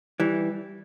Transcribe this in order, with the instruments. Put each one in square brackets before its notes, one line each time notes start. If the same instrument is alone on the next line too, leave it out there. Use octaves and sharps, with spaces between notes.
[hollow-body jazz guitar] E3 G3